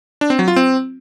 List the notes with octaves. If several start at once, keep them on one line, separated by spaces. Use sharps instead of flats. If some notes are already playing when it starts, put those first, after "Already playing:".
D4
C4
F#3
F4
C4